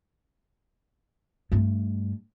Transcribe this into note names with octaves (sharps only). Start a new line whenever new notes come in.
G2 A3